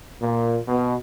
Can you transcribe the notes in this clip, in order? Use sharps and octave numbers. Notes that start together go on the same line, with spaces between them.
A#2
B2